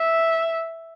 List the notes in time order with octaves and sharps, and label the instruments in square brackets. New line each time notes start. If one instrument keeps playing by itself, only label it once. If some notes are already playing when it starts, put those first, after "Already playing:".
Already playing: [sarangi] E5